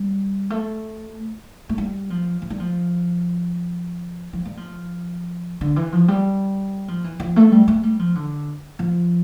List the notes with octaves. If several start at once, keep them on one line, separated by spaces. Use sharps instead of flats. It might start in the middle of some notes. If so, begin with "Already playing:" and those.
Already playing: G3
A3
A3
G3
F3
F3
G3
F3
F3
G3
F3
D3
E3
F3
G3
F3
E3
F3
A3
G3
A3
G3
F3
D3
F3